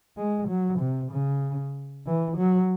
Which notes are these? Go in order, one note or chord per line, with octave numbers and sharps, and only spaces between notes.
G#3
F#3
C3
C#3
E3
F#3